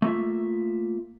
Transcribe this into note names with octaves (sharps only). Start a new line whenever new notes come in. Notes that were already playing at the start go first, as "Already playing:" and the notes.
A3 A#3 F4 E5